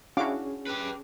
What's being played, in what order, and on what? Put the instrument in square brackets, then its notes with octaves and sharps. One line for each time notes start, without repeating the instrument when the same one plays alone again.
[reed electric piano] C#4 G#4 [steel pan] D4 F#4 D6 [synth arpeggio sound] E4 F5
[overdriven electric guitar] G4 B4